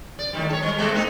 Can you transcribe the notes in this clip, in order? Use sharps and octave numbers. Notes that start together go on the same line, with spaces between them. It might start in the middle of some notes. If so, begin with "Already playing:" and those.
D5
A2 D#3 G3
A4 C#5
G3
C3 G#3 A3
A#3 C4 D#4